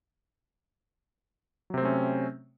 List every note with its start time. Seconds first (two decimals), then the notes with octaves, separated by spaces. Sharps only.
1.70 F#3
1.74 C3
1.78 C4
1.81 A3
1.85 C#4